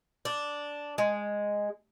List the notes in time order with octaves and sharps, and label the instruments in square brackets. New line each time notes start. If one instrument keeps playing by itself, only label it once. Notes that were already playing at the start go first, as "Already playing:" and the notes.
[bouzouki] D4
G#3